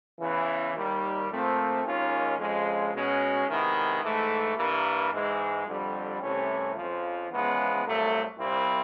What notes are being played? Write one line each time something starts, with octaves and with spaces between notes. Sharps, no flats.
E2 C#3 E3
D#2 D#3 G3
A#2 F3 A3 C4
D#2 D#3 G#3 C#4 F4
F2 C#3 F3 G#3
B2 G#3 C#4 F#4
C3 D#3 G#3 B3 E4
G#2 E3 A3
G2 E3 G3 A#3
G#2 E3 G#3
F2 D3 G3
C2 C3 E3 A3 C#4
F2 C#3 F3
E2 C#3 F3 G#3 B3
C2 A#2 F#3 A3
C2 A#2 G3 C4 E4